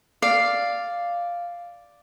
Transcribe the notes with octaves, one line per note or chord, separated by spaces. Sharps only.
D5 F5